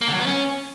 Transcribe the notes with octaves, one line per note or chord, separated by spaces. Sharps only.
A#3
D3
F#3
B3
C#4